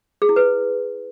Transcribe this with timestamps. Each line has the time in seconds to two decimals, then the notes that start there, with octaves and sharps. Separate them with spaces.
0.22 G#4
0.29 E4
0.36 B4